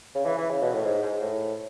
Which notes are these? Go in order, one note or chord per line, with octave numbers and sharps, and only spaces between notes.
C#3
E3
E3
C#3
B2
A2
G#2
G#2
A2